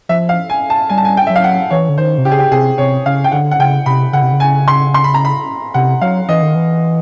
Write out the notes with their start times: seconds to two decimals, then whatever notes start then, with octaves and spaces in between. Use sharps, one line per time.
0.09 F3 E5
0.29 F5
0.50 G#5
0.70 A5
0.90 G3 G#5
0.98 A5
1.05 G#5
1.17 G5
1.27 F#3 E5
1.36 F5
1.44 F#5
1.71 E3 C#5
1.89 D3
1.98 D#3 C5
2.18 C3
2.25 C#3 G4
2.32 G#4
2.39 G4
2.51 C3 G#4
2.78 C3 C#5
3.05 C#3 F5
3.24 G5
3.32 D3 F#5
3.51 F#5
3.59 C#3 G5
3.86 C3 B5
4.13 C#3 F#5
4.22 C3
4.32 C#3
4.40 G#5
4.68 C6
4.94 C6
5.04 B5
5.14 A#5
5.25 B5
5.74 C3 F#5
6.02 F#3 F5
6.29 E3 D#5
6.42 D#3
6.55 E3